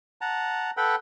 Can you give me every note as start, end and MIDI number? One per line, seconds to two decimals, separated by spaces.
0.21 0.71 78
0.21 0.71 81
0.21 0.71 82
0.77 0.96 69
0.77 0.96 71
0.77 0.96 78
0.77 0.96 79
0.77 0.96 83